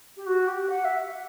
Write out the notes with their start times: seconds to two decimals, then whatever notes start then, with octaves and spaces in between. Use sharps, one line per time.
0.17 G4
0.26 F#4
0.47 G4
0.69 F#5
0.84 E5